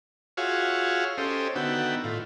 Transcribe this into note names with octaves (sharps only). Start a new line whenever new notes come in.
F4 F#4 G#4 C#5 E5 F5
C#4 G4 A4 C5 D#5
D3 D#3 B3 F#4 E5 G5
A2 F4